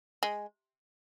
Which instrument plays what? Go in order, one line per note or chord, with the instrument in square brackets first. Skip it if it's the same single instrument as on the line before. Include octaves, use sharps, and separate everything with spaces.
[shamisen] G#3